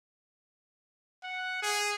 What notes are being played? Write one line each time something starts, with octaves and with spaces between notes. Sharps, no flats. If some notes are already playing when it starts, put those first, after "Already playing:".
F#5
G#4